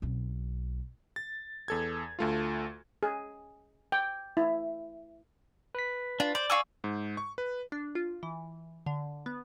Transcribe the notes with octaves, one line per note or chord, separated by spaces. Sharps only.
B1 C4
A6
E2 A4 G#6
D2 A3 F4
G#4
G5
E4
B4 B6
D4 F4
C5 D5
F5 G#5 C#6 E6
G#2
C#6
B4
D4
F4
E3
D3
B3